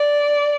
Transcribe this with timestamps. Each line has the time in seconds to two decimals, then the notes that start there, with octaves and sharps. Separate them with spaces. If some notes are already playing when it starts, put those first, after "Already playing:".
Already playing: D5